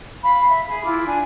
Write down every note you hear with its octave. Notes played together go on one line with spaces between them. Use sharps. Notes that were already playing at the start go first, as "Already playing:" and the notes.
F5 B5
E5
G#4 B5
E4 F4 D6
D4 G#5